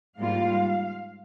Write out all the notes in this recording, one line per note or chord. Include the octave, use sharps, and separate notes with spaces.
G#2 G3 A#3 F4 F5